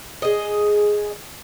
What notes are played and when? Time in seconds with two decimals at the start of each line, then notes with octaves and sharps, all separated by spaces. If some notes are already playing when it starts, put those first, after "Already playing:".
0.22 G#4 D#5